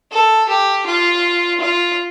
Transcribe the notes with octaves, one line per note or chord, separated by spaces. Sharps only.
A4
G4
F4
F4